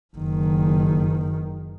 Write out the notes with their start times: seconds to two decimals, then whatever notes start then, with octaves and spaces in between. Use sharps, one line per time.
0.16 F#1 D#3